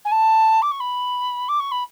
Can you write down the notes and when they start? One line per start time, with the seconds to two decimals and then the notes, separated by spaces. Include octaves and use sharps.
0.05 G#5
0.12 A5
0.62 D6
0.71 C#6
0.80 B5
1.49 D6
1.60 C#6
1.72 B5